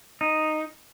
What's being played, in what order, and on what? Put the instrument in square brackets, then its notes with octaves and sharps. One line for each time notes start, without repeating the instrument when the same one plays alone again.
[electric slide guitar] D#4